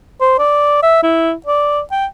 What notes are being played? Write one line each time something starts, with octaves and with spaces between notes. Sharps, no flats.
C5
D5
E5
E4
D5
G5